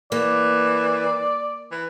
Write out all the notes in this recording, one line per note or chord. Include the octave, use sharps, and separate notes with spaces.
E3 A#3 D5
E3